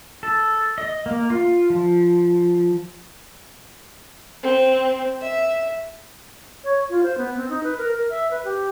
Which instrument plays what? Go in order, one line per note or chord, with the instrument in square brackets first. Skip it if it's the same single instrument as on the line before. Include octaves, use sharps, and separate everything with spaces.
[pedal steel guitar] A4
D#5
A#3
F4
F3
[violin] C4
E5
[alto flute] C#5
F4
C5
B3
C4
D#4
B4
A#4
A#4
E5
B4
G4